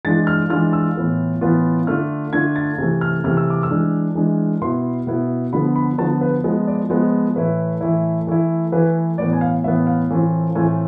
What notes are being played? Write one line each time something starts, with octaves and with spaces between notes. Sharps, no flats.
E3 G#3 D4 F4 A6
F6
E3 G#3 D4 F4 F6
E6
A2 E3 B3 F4
A2 E3 B3 F4
D3 A3 D4 F4 F6
D3 A3 D4 F4 G#6
A6
C3 E3 A3
F6
C3 E3 A3 F6
E6
D6
E6
E3 G#3 D4
E3 G#3 D4
B2 B3 E4 C6
B2 B3 E4
D3 F3 B3 B5
B5
D3 F3 B3 A5
B4
F3 G#3 B3
D5
F3 G#3 B3 C5
A2 E3 A3 E4 B4
A2 E3 A3 E4
E3 A3 E4
E3 A3 E4 B4
A2 E3 B3 D5
G#5
F5
A2 E3 B3 E5
F5
A2 E3 A3 C4 F4
A2 E3 A3 C4 F4 G#5